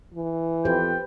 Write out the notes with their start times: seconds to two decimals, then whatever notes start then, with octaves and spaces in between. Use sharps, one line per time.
0.14 E3
0.65 F2 G4 B4 C5 G5